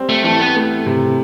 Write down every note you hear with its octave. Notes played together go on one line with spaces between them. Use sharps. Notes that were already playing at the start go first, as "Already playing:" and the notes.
Already playing: G3 C4
A3
E3 A3
B3
A3
C3